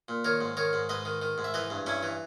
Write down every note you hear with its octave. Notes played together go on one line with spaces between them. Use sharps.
A#2
D#3 A#4 C#5
G#2
D#3 A#4 C#5
G#2
G#2 B4 D#5
D#3
D#3
G#2
E5
E3 B4 D#5
G2
G2 C#4 E4
E3